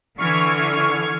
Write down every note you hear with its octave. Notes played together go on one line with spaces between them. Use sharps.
D3 E3 C#6 F6 G#6